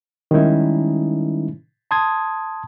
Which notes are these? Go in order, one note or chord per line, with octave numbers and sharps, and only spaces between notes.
D#3 G3 G#3 C#4 D#4 E4
A5 C6 D#6 G#6